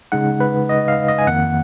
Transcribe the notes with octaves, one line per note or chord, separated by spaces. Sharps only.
C#3 G#3 D#4 F#5
B4
D#5
F5
D#5
G#5
F2 D#3 A#3 F#5